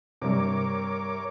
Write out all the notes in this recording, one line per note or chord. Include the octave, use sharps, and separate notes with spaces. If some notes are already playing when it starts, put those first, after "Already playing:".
G2 C3 A#4 C#5 D6